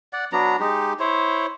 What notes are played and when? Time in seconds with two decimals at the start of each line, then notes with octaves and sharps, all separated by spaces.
0.13 D5 F#5
0.33 F#3 B3 D4 A#5
0.60 G#3 D#4 G4
0.99 E4 C5 C#5